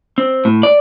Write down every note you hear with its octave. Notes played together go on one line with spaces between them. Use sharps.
C4
A2
D5